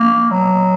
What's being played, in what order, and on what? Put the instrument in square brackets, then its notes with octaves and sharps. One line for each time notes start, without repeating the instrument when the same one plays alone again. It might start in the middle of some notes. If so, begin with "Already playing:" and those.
Already playing: [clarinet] A#3
F#3